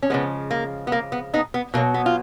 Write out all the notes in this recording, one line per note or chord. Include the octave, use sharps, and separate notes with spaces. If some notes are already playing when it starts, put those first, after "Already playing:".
C#4
C#3 F3 G#3 B3
A#3
B3
A#3
B3
B3 D#4
B3
B2 F#3 A#3
B3
F4